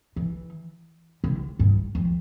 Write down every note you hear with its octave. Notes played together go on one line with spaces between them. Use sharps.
E3
D3
G2
F2